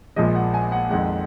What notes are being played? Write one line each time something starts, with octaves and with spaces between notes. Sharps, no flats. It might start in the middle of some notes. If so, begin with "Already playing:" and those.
A#1 A#2 F3 G#3 D#5
F#5
G#5
F#5
F2 D#3 G#3 F#5